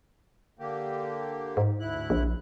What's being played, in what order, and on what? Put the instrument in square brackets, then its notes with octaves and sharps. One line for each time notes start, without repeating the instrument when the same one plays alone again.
[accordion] D3 A#3 G4
[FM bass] G#2
[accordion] D2 E4 F#6
[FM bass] A#1